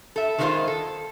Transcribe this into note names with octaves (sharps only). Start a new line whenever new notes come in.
A4 E5
D#3 G#3 B3 E4 F4 C5
A4